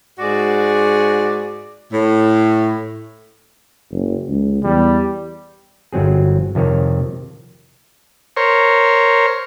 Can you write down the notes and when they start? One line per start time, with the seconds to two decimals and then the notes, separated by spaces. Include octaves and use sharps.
0.19 G#2 F#4 G#4 D5
1.92 A2
3.92 F#1
4.28 C#2
4.64 E2 G3
5.93 G1 F#3 C4 G#4
6.55 F2 C3 D#3 C#5
8.37 A#4 C5 C#5